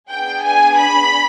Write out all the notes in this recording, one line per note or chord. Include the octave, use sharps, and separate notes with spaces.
B3 D4 G#4 G5
G#5
B5